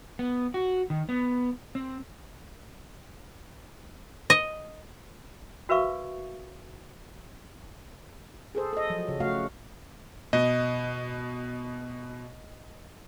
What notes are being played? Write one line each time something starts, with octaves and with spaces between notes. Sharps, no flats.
B3
F#4
D#3
B3
C4
D#5
F#4 A#4 B4 E5 F5 C#6
G#4 A4 C5
A4 D#5
F3 F#3
C#3
C#3 A3 F#4 F5
B2 D#5